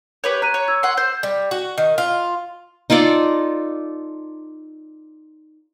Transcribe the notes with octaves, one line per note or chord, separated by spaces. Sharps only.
G4 B4 C#5
A#5 F6 F#6 D#7
C#5
E6 G#6
F#5 C6
C5
G3
F#4
D#3
F4
D#4 F4 A4 D5